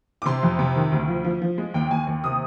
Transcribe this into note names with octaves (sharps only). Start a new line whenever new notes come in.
D6
C3 C6
F2
C3
D#3
D2
F3
F3
F3
G#3
D#2 G5
D#2 G#5
D#2
C3 D#6